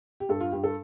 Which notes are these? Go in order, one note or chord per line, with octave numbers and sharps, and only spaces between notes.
G4
G2 A4
F4
G2 G4
A4